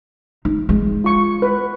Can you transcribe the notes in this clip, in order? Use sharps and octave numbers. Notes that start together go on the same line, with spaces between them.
D#4
G#3
F4 C#6
B4